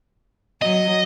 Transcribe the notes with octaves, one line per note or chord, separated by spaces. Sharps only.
F#3 D#5